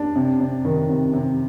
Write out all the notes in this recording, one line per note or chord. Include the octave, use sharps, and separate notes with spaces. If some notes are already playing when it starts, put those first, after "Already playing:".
Already playing: D4
C3
C3
D#3
C3
C3